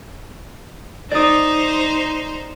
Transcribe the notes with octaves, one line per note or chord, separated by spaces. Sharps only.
D#4 C5 D5 D#6